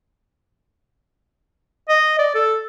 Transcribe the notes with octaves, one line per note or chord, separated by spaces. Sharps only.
D#5
D5
A4